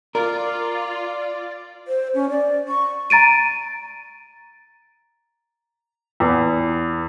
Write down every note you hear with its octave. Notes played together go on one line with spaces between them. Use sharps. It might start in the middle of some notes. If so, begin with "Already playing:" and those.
F4 A#4 D5
C5
C#4
D5
C#6
A#5 A6 D7 D#7
E2